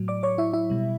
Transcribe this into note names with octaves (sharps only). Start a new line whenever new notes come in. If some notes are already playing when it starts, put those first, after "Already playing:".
Already playing: A2 F#3
D5 D6
C#5 C#6
E4 E5
E4 E5
B2 G3